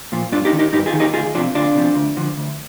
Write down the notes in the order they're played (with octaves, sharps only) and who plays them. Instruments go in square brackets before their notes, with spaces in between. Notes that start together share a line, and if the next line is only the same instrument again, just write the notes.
[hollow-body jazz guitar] A#2 F3
G2 D4 F4
D#4 G4
D#3
D#4 G4
G2 D#4 G4
F4 G#4
D#3
D#4 G4
D2 F4 G#4
C3 F3 D4 F4
D2 D4 F4
C3 F3
D2
D3 F3
D2